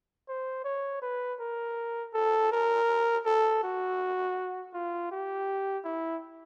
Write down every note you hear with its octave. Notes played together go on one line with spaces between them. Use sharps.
C5
C#5
B4
A#4
A4
A#4
A4
F#4
F4
G4
E4